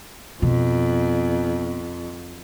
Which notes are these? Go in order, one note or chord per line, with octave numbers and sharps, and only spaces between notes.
F2 B2